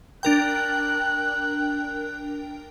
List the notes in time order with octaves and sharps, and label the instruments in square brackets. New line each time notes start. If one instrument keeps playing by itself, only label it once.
[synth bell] D4 A#4 G5 [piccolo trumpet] F#6